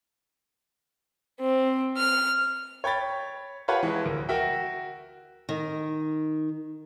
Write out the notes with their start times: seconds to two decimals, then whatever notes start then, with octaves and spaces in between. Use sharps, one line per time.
1.40 C4
1.97 F6
2.84 C#5 G5 B5 A6
3.68 F4 G4 B4 C#5 F#5 A5
3.83 E3 G#3
4.04 D2 A#4
4.29 F#4 A#4 E5 G5
5.49 D#3